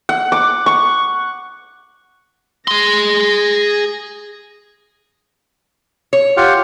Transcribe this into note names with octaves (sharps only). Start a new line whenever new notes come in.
F#5
D6
C#6
G#4 C6 A#6
C#5
F4 G4 F#5